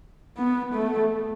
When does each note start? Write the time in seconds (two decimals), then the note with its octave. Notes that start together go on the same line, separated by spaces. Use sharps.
0.37 B3
0.74 A3